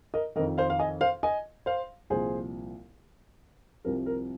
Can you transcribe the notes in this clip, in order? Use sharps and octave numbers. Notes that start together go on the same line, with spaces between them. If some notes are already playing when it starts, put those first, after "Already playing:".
A#4 D#5
F2 D#3 A#4 D#5
C5 F5
F5
D#5 G#5
C5 F5
D#5 G#5
C5 F5
C2 A#2 F3 G#4 C5
C2 C3 F3 A#4
A#4